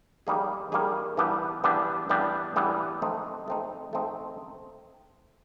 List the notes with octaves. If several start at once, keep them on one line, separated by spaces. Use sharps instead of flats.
D#3 G3 A#3 D#4 G#4
D#3 G3 A#3 D#4 G#4
E3 G3 B3 D4 G4
E3 G3 B3 D4 G4
E3 G3 B3 D4 G4
E3 G3 B3 D4 G4
A3 C4 D#4
A3 C4 D#4
A3 C4 D#4